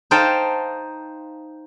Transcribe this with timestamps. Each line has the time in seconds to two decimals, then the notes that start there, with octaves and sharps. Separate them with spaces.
0.11 D#4 C5 F5 G5 A5